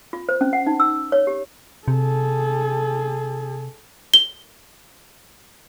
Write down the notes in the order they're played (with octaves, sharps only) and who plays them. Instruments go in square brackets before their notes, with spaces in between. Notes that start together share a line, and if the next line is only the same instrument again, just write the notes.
[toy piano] F4
C5
C#4
F#5
D#4
E6
C#5
G4
[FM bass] C3 [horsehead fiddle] G#4 A4
[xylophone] G7